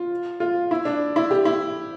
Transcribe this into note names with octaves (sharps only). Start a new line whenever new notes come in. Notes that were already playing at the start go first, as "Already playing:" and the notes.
Already playing: F4
F4
E4
D4
E4
G4
E4